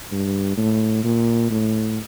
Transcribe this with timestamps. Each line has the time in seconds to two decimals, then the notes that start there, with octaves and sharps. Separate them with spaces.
0.12 G2
0.57 A2
1.04 A#2
1.50 A2